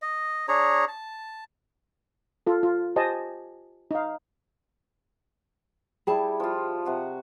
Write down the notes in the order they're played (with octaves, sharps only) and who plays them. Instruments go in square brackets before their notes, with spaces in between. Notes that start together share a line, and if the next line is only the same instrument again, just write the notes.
[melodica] D#5
D4 G#4 C#5 A#5
A5
[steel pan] F4 A4
F4
G4 C5 D#5 G#5 A5
D#4 F5
[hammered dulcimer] G3 E4 [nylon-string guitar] G#4 G5 A5
[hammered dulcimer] F3 F4
C3 F#4 F#5